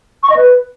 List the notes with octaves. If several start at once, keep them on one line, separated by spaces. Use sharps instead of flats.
C#6
D#5
B4